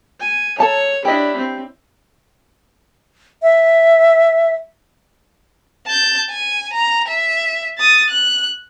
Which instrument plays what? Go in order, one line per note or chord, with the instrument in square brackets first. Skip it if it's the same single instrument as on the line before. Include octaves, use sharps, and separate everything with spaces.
[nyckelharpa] G#5
[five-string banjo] A4 A5 A#5 [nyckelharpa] C#5
[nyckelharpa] D4 E4 [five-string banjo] G4 D#5
[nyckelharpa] C4
[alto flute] E5
[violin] A5 G6
G#5
A#5
E5
D#6 A6
F#6